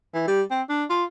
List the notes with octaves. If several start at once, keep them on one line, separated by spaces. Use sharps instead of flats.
E3
G3
C4
D4
F4